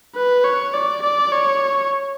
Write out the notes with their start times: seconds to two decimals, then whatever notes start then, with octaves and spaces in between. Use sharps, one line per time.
0.16 B4
0.44 C#5
0.73 D5
1.02 D5
1.32 C#5